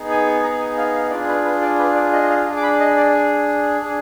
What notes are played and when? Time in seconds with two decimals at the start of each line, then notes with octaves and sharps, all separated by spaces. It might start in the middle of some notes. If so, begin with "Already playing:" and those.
Already playing: B3 D#4 G#4
0.10 G#5
0.27 G#5
0.43 A#5
0.60 G#5
0.77 F5
0.95 F5
1.10 D4 F4 G#4 D5
1.28 B4
1.45 B4
1.62 D5
1.79 B4
1.95 D5
2.13 D#5
2.23 D#5
2.29 F5
2.47 D4 G#4
2.57 D6
2.63 B5
2.80 D#5
2.97 D5
3.81 D4 G#4